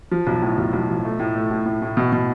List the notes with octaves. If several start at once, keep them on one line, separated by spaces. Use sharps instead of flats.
F3
B1
A2
B1
B1
F3
A3
A2
A3
A2
A2
A2
B2
B2